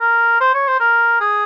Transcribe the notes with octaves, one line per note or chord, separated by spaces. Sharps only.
A#4
C5
C#5
C5
A#4
G#4